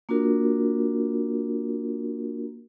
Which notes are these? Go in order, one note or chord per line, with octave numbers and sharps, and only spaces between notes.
A#3 D4 F4 F#4 A#4